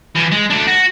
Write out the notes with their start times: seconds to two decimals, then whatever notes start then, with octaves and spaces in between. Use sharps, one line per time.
0.16 E3 F3
0.32 G#3
0.50 A3 D4
0.67 F#4